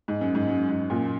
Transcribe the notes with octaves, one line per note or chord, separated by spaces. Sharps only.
G#2
F#2
G#2
F#2
G#2
F#2 A#2